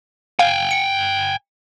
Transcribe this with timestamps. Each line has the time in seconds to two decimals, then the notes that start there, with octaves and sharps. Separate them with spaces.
0.39 F5 G5 G#5
0.71 C#7